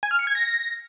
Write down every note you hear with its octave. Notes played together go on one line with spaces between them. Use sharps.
G#5
F6
C#7
G#6
A#6